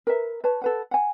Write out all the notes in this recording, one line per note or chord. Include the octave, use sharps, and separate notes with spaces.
A#4 B4 E5
B4 C#5 A5
A4 B4 F#5
F#5 G#5